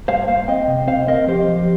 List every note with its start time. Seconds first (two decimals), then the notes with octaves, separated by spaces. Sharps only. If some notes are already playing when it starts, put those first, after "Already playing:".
0.08 G2 C5 F5
0.28 A#3 C5 F5
0.48 C4 D#5 G5
0.68 C3
0.87 C4 C5 F5
1.07 C4 A#4 D#5
1.27 F3 G4 C5
1.48 F3